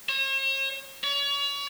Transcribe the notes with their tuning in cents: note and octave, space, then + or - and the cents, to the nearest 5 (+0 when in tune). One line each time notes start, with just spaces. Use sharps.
C#5 -45
C#5 +35